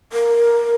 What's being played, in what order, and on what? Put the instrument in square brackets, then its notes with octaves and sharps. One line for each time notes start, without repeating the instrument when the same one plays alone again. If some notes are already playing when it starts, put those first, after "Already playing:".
[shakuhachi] A#4